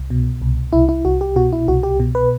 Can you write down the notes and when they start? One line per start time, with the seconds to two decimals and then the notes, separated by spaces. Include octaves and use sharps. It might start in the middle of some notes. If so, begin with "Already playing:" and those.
Already playing: C2
0.10 B2
0.42 C2
0.73 C2 E4
0.89 E4
1.05 C2 F#4
1.21 G4
1.36 B2 F#4
1.53 E4
1.68 C2 F#4
1.83 G4
2.00 B2
2.15 B4